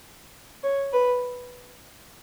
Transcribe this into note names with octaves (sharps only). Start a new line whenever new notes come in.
C#5
B4